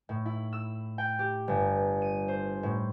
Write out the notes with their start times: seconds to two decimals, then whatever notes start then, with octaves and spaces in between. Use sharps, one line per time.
0.09 A2
0.26 E4
0.53 E6
0.98 G5
1.19 G4
1.48 G1
2.02 D#7
2.28 C5
2.63 A2